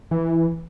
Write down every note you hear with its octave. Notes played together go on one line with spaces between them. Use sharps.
E3